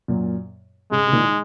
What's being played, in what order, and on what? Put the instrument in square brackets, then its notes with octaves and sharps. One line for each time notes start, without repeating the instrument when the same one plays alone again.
[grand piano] F#2 A#2
[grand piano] G#2 C#3 [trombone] G#3
[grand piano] C#3
A#2 D#3
D#4